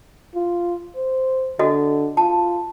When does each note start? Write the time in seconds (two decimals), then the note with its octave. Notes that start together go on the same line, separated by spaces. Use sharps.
0.35 F4
0.96 C5
1.59 D3 F#4 A4 D#5
2.17 F4 A5